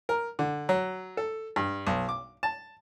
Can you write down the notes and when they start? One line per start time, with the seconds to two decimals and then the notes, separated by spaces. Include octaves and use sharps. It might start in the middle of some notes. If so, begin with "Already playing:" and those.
0.09 A#4
0.39 D3
0.69 F#3
1.17 A4
1.56 G2
1.87 B1
2.09 D6
2.43 A5